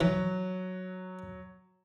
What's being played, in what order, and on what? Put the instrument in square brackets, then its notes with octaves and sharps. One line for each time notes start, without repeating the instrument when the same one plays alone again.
[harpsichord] E3 [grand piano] F#3